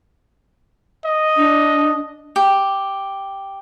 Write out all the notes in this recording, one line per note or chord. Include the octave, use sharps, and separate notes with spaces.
D#5
D4
G4